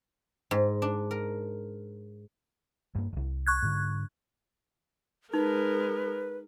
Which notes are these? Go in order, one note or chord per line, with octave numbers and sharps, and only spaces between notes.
G#2
D4
A#4
G2 A#3
D1 C2
C#6 F#6 G#6
G#2 D3
G#3 D#4 A#4 B4